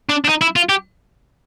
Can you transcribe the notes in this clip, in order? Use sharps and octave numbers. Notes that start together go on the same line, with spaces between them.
D4
D4
D#4
E4
F4
G4